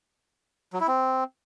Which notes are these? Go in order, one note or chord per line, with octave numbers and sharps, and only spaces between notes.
F#3
E4
C4